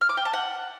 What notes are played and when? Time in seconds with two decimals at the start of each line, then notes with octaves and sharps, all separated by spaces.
0.01 F6
0.09 D6
0.17 G5
0.25 A5
0.33 F#5